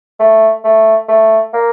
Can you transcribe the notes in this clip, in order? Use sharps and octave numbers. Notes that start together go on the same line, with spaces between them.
A3
A3
A3
A#3